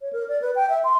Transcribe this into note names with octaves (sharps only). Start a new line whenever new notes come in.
C#5
A#4
D5
B4
G5
E5
C6